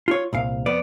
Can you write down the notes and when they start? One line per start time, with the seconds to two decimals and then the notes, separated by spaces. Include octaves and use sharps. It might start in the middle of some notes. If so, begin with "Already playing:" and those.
0.08 F4 C#5
0.33 C2 A#2 F5
0.66 F2 B3 D5